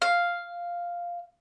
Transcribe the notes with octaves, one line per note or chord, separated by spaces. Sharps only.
F5